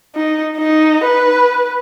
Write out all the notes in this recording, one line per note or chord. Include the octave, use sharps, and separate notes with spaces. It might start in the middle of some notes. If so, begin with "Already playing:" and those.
D#4
D#4
B4